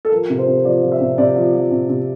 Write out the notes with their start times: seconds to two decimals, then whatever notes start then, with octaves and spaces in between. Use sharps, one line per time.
0.05 A4
0.12 F3 A#4
0.30 C3
0.38 C5
0.47 C3
0.65 F3 D5
0.83 F3
0.92 E5
1.01 C3
1.18 C3 D5
1.36 F3
1.53 F3
1.71 C3
1.89 C3